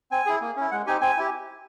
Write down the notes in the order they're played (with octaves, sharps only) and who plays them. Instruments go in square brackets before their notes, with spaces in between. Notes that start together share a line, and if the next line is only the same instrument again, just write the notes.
[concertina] C4 G#5
E4 G#4
A#3
C#4 E4
G#3 F#5
C4 D#4 G4 G#5
C4 G#5
E4 G4